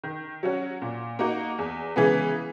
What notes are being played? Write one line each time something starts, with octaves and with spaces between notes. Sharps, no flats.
D#3
F#3 C#4 F#4
A#2
A#3 D#4 F#4
E2
C#3 E3 G#3 B3